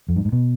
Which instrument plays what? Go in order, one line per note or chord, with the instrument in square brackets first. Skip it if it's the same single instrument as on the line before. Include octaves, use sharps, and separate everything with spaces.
[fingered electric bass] F2
G2
G#2
B2